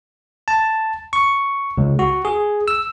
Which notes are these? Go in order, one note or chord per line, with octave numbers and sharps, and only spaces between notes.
A5
C#6
C#2
F#4
G#4
E6